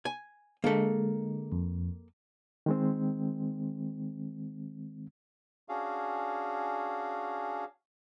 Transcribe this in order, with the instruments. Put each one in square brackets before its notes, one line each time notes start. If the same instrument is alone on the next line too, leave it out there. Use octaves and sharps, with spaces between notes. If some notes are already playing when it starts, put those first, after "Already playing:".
[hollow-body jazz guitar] G#5
[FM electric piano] D3 G#3 [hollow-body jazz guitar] A#3 A4
[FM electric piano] F2
[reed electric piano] D#3 G#3 C4
[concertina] C#4 D4 F#4 G#4 F5